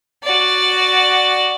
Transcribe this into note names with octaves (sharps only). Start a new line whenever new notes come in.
F#4 D5